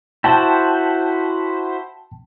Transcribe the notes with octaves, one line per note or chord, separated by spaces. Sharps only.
E4 F#4 C5 G5 A5